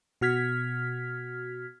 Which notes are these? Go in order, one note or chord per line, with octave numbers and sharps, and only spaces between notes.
B2 F#4 F6 G#6 B6